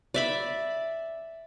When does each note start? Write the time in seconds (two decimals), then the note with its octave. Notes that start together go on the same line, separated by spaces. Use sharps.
0.14 D5 E5 B5